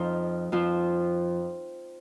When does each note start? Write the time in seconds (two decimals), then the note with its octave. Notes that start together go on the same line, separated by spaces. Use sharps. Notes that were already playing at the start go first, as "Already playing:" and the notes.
Already playing: F2 F3 D#4 F4
0.52 F2 F3 F4